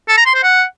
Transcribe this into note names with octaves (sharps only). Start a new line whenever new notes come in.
A4
A#5
C6
C5
F#5